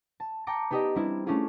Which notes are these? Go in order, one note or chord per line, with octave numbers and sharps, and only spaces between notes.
A5
G5 A5 A#5 D6 C#7
B3 D#4 G4 D5 D#5 A#5
G3 C4 D4 E4
A3 C#4 D4 E4 F4 G#4